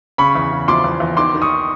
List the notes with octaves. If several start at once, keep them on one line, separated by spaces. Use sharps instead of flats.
C#3 B5 C#6
E2
C#3
F3 C6 D6
E2
E2
D#3 C6 D6
D#3
C#6 D#6